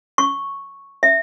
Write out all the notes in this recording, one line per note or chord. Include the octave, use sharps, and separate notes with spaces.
C#6
E5